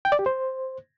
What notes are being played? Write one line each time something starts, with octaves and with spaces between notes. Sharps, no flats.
G5
D5
G4
C5